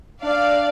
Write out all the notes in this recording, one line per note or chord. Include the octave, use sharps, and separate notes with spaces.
D4 D5 F5